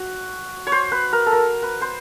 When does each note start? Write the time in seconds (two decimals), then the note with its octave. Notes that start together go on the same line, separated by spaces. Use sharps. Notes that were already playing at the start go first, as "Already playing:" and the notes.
Already playing: F#4
0.67 C#5
0.72 C5
0.92 B4
1.13 A#4
1.26 A4
1.32 A#4
1.63 B4
1.81 C5